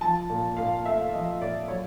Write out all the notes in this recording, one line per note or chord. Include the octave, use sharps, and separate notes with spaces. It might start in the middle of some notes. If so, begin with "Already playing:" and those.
F3 A5
A#2
A#2 F5
A3 E5
F3 D#5
A#2 D5
F#3 C#5